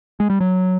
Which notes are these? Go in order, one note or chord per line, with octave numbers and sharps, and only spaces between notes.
G#3
G3
F#3